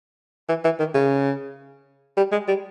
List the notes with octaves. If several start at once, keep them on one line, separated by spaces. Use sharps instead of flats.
E3
E3
D#3
C#3
G3
G#3
G3